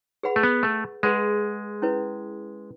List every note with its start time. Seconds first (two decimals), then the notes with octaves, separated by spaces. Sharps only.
0.23 G#4 B4 F#5 B5
0.36 A3
0.43 B3
0.63 A3
1.03 G#3 G#4 B4 F#5 B5
1.82 C#4 E4 B4